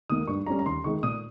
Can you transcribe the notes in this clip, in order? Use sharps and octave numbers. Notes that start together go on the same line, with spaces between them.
D#3 A#3 D#4 D#6
G2 C#6
G3 C#4 A#5
A#5
D#2 C6
D#3 G#3 D#4 C#6
A#2 D#6